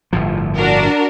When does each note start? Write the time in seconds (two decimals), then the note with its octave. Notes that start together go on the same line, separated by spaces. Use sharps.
0.13 G1 A2 F3
0.55 D4 F#4 A#4